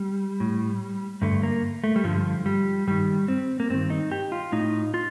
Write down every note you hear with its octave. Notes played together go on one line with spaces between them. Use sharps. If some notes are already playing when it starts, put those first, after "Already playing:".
Already playing: G3
A2
G2 D3 A3
A#3
A3
G3
G2 D3 F3
G3
G2 D#3 G3
C4
A#3
G2 D#3 C4
D#4
G4
F4
A2 D#4
F4